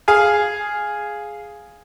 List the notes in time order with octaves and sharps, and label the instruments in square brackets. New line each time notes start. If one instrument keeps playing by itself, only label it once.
[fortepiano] G#4 F5 G#5